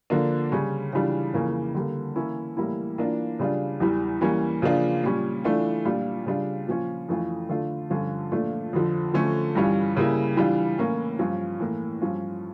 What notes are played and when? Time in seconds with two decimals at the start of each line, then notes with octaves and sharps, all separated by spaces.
0.10 D3 F3 A#3 D4
0.52 C#3 G3 C#4
0.93 C#3 E3 G3 D4 F4
1.34 F2 C#3 E3 A#3 C#4
1.75 D3 G3 A#3
2.16 E3 A#3 C#4 E4
2.57 A2 E3 G3 A#3 E4
2.98 E3 A#3 D4 F4
3.39 C#3 G3 D4 F4
3.80 E2 E3 G3
4.21 E3 G3 A#3 C#4
4.62 C#3 F3 A#3 D4 F4
5.04 A#2 G3 C#4
5.44 E3 A3 D4 F4
5.85 A#2 G3 D4 F4
6.26 C#3 G3 D4 F4
6.67 A#2 F3 C#4 F4
7.09 F2 E3 A3 C#4 F4
7.49 D3 A3 D4 F4
7.90 G2 D3 F3 C#4 F4
8.32 A#2 F3 A3 D4 F4
8.73 F2 D3 F3
9.14 D3 F3 A3 C#4
9.55 G2 E3 G3 C#4 F4
9.96 C#3 G3 A#3 E4
10.37 E3 G3 D4 F4
10.78 A2 E3 A#3 C#4
11.19 G2 F3 C#4 F4
11.60 A2 E3 A#3
12.01 G2 F3 C#4 F4